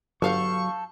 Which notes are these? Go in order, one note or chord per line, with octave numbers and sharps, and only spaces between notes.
G1 F#3 A4 F5 C#6 G6